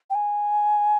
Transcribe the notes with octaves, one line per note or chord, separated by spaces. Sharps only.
G5
G#5